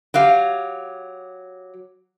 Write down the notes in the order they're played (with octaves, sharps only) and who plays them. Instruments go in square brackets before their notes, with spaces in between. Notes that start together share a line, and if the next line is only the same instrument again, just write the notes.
[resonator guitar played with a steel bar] F#3 G4 F5